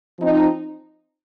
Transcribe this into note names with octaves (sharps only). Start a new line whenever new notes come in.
F3 C4 D#4